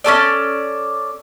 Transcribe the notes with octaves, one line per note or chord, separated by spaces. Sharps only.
C#4 F4 A4 D5